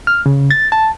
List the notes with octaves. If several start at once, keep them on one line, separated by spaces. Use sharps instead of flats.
F6
C#3
A6
A5